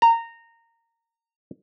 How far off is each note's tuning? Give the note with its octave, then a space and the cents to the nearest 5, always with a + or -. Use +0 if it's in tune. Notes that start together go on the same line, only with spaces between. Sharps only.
A#5 -15